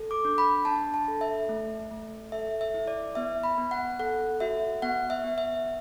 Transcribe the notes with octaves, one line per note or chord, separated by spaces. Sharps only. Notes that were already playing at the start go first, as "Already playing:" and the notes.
Already playing: A4
D6
D4
B5
D4 A5
A5
A4
E5
A3
A3
A4 E5
E5
E4
D5
B3 E5
B5
B3
F#5
A4 F#5
F#4 E5
B3 F#5
E5
B3
E5